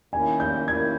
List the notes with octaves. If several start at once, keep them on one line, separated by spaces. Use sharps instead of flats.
D#3 A#3 C#4 E4 G#5
G6
D#3 A#3 C#4 E4 G#6